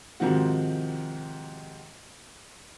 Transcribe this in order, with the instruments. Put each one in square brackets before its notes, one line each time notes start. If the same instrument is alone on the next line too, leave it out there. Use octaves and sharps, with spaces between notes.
[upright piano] G#2 C3 D#3 F3 C4 F#4